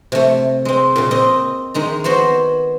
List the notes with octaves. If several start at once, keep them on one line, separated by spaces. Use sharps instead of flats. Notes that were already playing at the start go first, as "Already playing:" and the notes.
C3 A3
G#3 C4
A#2 C#3
C4 D#5
D#3 G#3 A#5
B3 F#4 C5 C#5